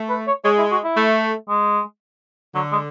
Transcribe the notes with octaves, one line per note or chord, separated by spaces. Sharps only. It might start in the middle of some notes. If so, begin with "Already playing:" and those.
Already playing: A3
B4
C#5
G#3 C#5
E4
F#4
E4
A3
G#3
D3 F#3
G#3